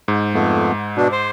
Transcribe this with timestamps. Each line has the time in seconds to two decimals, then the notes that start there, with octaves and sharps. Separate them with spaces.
0.08 G#2
0.34 F2 A3 B3
0.97 B2 D4
1.12 C5